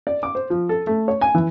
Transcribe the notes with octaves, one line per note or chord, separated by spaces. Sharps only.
D5
D6
C5
F3
A4
A3
C#5
G#5
E3